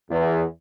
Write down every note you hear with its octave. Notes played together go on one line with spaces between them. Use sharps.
E2